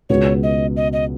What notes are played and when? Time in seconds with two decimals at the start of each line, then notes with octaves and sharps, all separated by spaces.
0.09 C#2 B2 B3 F#4 C#5
0.43 D#5
0.76 D#5
0.93 D#5